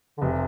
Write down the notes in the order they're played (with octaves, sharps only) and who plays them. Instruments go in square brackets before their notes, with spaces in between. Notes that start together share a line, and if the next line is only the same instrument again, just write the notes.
[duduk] D3
[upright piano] F1 [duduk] C3